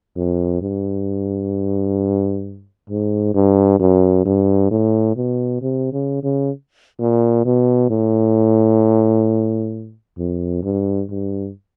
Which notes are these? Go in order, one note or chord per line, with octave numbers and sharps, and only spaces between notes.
F2
G2
G#2
G2
F#2
G2
A2
B2
C3
C#3
C#3
A#2
B2
A2
F2
G2
G2